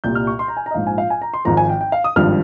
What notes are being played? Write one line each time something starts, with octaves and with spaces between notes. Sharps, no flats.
C2 A#2 G3 G6
F6
C#6
C6
A#5
G#5
A#5
D#5
A#1 G#2 F3 F5
G#5
F5
G#5
A#5
C6
G#1 G#2 F3 A#5
G#5
G5
G5
F5
D#6
G#1 G2 F3 F6